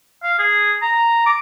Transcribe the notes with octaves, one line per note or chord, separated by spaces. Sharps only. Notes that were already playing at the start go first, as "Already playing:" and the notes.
F5
G#4
A#5
D6